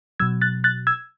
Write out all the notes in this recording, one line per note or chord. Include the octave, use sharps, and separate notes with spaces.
B2 F#3 E6 G#6
F#6 A6
F#6 A6
E6 G#6